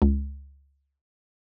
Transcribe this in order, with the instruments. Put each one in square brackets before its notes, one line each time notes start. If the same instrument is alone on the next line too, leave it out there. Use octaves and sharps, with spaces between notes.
[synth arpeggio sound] C#2